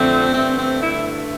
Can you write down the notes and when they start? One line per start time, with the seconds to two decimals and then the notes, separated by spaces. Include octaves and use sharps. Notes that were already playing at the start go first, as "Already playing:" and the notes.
Already playing: F2 D3 A3 C4
0.34 G2 D3 A3 C4
0.58 C4
0.83 E4